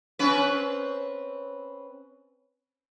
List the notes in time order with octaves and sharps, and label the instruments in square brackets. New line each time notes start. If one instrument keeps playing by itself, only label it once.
[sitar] C4 C#4 B4